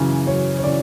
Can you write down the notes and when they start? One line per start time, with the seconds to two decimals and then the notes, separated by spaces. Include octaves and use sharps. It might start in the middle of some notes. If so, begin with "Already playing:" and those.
Already playing: F#2 C#3 E3
0.27 F#2 C#5
0.59 C#5
0.63 C#3 E3 D5